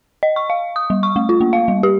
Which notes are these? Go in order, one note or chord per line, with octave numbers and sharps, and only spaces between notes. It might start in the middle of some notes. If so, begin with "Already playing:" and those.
D#5
C#6
F5
D#6
G3
C#6
A3
F4
A#3
F5
G3
G4